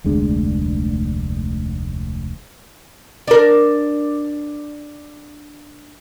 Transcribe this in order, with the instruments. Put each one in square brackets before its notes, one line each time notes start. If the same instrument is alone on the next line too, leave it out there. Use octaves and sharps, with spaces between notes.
[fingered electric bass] F1 D2 G#3 D4
[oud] D4 A#4